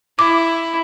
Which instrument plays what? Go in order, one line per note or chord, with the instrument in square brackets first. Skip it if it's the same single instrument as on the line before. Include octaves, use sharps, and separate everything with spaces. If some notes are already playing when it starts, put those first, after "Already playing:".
[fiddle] E4 [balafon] D6